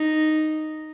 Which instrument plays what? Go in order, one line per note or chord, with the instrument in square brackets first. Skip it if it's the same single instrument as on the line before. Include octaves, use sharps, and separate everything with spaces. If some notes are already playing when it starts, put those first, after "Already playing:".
Already playing: [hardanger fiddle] D#4